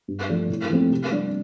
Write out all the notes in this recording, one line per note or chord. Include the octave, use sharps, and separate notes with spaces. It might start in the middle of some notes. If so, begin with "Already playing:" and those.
G2
F3 A3 D4
A2
F3 A3 C4
C3
G3 D4